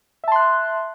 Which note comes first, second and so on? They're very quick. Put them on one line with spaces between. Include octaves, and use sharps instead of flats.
E5 A5 C6 F#6